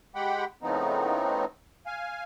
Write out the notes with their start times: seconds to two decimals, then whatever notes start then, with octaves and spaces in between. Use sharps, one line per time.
0.15 G#3 G4 F#5 G5 B5
0.63 A2 C#3 F3 B3 C4 D#4
1.86 F5 G#5